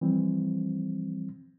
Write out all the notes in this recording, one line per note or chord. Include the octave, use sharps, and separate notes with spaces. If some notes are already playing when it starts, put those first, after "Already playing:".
E3 F3 G3 C4